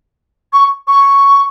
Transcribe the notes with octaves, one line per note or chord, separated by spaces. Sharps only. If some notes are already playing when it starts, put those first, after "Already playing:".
C#6
C#6